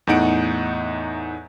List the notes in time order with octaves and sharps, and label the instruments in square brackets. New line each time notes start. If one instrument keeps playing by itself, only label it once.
[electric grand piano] E2 A2 D#4 F#5 D7